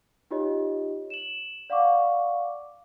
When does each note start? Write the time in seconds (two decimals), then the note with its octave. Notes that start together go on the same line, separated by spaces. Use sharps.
0.31 D#4 F4 G4 C#5 D#5
1.10 E7 F#7
1.70 D5 F5 F#5 C#6 D6